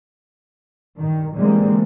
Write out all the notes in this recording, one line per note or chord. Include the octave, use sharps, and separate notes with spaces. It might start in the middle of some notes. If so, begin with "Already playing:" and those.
G2 D#3
D3 E3 G3 G#3 A#3 C4